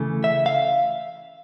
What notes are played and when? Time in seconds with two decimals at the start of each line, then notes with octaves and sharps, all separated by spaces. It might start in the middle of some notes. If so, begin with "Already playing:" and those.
Already playing: C#3 E3 A3
0.24 E5
0.46 F5